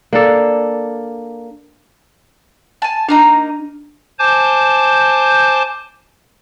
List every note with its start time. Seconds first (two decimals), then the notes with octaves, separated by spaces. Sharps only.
0.13 A#3 D4 A4
2.82 G#5 A5
3.09 A#3 D4 D#4 A#5
4.19 C5 G#5 A5 D6 G6